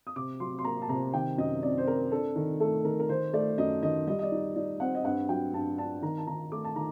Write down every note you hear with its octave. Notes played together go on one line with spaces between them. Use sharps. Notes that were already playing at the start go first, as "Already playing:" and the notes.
D#6
C3 D6
F#3 C6
C6
A#3 A#5
A5
C3 A#5
D#3 G5
F#2 D#5
C4 D5
C5
C4 A#4
D4 A4
D#3
A3 A4
D#3 A#4
A#4
D#3 C5
A3 D5
F#2 D#5
D#3 D#5
G3 D#5
D#5
D5
D#4
D#4 D5
C4 F#5
D#5
G2 F#5
F#3 G5
G2 A5
D4 A5
D#3 A#5
A5
D#3 A#5
A3 D6
A5
D#3 A#5